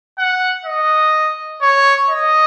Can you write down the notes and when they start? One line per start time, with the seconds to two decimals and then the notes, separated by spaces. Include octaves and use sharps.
0.18 F#5
0.65 D#5
1.62 C#5
2.10 D#5